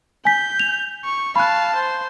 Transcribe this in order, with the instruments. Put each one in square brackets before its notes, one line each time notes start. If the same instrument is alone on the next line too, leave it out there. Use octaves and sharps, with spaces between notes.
[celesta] G#5 B6 [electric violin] G6
[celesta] F7
[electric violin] C#6
[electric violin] F5 A5 [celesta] B5 F#6
[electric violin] C5